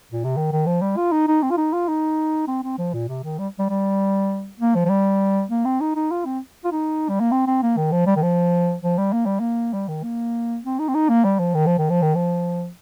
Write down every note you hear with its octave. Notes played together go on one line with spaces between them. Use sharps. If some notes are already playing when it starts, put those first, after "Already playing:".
A#2
C3
D#3
D#3
F3
G3
F4
D#4
D#4
C4
F4
D#4
F4
D#4
C4
C4
F3
A#2
C3
D#3
G3
G3
G3
A#3
F3
F3
G3
A#3
C4
D#4
D#4
F4
C4
F4
D#4
G3
A#3
C4
C4
A#3
D#3
F3
G3
D#3
F3
F3
G3
A#3
G3
A#3
G3
D#3
A#3
C4
D#4
C4
D#4
A#3
G3
F3
D#3
F3
D#3
F3
D#3
F3